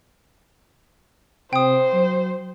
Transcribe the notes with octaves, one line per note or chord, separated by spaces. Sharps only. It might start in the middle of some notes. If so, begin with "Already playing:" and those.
C3 C5 G5 D#6
F#3